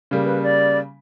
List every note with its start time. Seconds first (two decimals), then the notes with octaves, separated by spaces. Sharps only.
0.11 C#3 G3 A#3
0.24 B4
0.43 D5